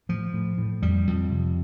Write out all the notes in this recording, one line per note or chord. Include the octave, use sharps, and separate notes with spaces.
A2 F3
A2
A2
F2 G3
F2
C3